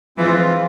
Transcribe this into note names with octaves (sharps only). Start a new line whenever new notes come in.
E3 G#3 C4 F4